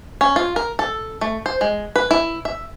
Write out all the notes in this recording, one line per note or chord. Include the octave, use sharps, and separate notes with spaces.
C#4
F4
A#4
A4
A3
C5
G#3
B4
E4
E5